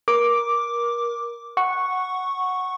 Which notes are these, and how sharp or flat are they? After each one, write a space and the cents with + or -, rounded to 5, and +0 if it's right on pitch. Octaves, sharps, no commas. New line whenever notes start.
A#4 +25 D6 +0
F#5 +0 C#6 -5